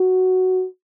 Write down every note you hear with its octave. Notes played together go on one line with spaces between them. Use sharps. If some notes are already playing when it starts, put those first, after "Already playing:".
Already playing: F#4